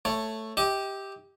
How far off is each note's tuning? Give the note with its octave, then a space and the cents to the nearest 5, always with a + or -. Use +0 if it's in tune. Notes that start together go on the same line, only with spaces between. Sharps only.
A3 +5 C#5 -5
G4 +0 D#5 +45